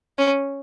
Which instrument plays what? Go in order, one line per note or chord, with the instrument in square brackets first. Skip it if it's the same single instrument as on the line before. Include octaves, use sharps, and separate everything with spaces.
[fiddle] C#4